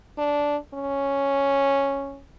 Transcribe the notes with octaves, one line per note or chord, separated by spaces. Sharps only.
D4
C#4